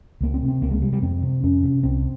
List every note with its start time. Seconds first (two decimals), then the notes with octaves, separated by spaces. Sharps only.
0.21 C#2 A#3
0.34 C4
0.42 C3
0.48 C4
0.62 C#2 A#3
0.71 G#3
0.82 C3 G3
0.93 G3
1.02 F2 C4
1.22 C3
1.43 F2 C#4
1.63 C3
1.83 C2 C4